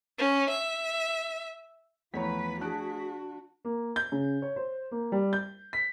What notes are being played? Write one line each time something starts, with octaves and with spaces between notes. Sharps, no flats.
C#4
E5
E2 F3 A3 B4 C#5 A#5 B6
D4 F#4 G#4 A5 F#6 D7
A#3
G6
C#3
C#5
C5
A#3
G3
G6
B6